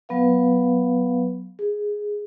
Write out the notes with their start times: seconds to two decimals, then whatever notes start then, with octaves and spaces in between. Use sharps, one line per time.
0.09 F#3 B3 B4 F5
1.59 G#4